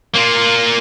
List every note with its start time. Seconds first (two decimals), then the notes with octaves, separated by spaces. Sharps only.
0.15 A#3 F4